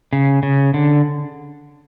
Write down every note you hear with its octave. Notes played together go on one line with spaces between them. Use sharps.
C#3
C#3
D3